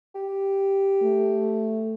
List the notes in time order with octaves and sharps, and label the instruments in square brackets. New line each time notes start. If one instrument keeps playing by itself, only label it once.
[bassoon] G4
[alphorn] A3